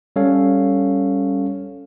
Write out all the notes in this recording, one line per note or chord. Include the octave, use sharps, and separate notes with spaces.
G3 C#4 A4 C#5 F5